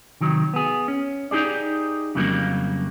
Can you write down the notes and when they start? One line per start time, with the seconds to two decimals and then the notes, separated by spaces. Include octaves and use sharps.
0.21 C3 D#3 F#3
0.54 B3 G#4
0.88 C#4
1.31 D#4 G4 G#4 D5
2.15 F2 C#3 F#3 G3 A#3